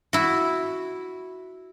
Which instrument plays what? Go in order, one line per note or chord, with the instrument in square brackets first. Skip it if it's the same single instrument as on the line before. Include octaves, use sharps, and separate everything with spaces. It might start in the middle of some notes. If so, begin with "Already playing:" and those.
[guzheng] E4 F#4